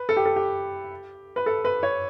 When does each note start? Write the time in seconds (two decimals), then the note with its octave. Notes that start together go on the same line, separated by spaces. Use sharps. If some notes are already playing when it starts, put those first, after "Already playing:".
Already playing: B4
0.09 A4
0.17 G4
0.26 A4
0.36 G4
1.36 B4
1.46 A4
1.65 B4
1.83 C#5